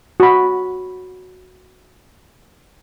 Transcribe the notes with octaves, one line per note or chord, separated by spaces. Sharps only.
F#4 B5